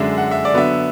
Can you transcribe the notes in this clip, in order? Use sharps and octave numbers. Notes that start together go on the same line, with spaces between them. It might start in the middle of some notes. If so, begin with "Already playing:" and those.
Already playing: F#2 D3 G#3 D4 E5
F#5
E5
D5
D3 F#3 B3 E5